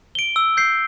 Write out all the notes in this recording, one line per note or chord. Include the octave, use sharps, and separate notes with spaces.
D7 G7
E6
G6 C7